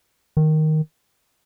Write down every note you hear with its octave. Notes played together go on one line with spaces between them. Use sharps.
D#3